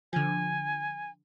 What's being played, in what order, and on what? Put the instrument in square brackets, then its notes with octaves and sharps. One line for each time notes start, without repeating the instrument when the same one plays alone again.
[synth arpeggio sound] D3 F3 [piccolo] G#5